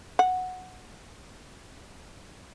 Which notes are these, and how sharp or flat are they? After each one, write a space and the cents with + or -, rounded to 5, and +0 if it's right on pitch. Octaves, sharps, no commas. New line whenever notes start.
F#5 -5